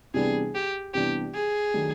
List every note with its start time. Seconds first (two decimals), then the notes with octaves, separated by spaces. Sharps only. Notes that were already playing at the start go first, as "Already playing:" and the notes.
0.14 C3 E3 G3 B3 D4 G#4
0.55 G4
0.94 C3 E3 G3 B3 D4 G4
1.34 G#4
1.74 D#3 F#3 A3 D4 G4